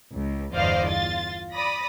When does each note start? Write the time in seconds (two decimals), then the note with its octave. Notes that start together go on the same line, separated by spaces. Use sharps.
0.12 C#2
0.53 G1 E2 C5 D5 D#5 F5
0.88 F4 A6
1.54 D5 B5 D#6 A#6